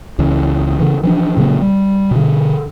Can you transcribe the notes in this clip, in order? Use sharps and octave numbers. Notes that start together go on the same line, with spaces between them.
C#2 C#3 E3
C#3 E3
E3 F3 D4
A#2 C#3 F#3 A#3
G3
B2 D3